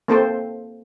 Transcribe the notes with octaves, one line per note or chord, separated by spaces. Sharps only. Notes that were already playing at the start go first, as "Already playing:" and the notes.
A#3 C4 A4 C5